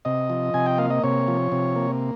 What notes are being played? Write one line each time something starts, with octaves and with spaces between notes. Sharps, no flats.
C3 D#5
F3
C3 G#5
G5
A#3 F5
D#5
C3 C#5
F3
C3
A#3